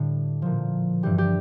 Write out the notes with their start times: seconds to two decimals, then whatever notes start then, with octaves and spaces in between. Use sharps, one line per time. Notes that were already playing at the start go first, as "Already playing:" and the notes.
Already playing: A2 D3 G3
0.42 A#2 F3
1.03 G2 E3 G3 G4
1.18 G4